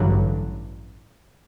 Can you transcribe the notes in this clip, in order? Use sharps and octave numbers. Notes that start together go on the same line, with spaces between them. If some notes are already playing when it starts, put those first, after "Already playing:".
Already playing: A1 G2 D3 F#3